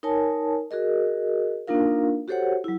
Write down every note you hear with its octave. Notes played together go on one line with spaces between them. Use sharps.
D#4 A#4 C#5 G#5 A5
F#4 G#4 A#4 D#5
A#3 D4 D#4 F4 A#4 F5
F#4 G4 A4 C5 C#5 F#5
F#3 E4